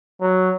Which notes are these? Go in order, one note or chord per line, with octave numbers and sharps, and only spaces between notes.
F#3